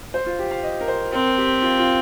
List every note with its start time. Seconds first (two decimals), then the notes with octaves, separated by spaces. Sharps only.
0.14 C5
0.26 F4
0.39 G4
0.51 F5
0.63 D#5
0.81 A#4
0.88 C5
1.13 C4 A#4
1.38 G4
1.62 F4
1.79 F4